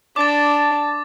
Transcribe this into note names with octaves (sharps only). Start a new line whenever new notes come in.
D4 A5 D6 A6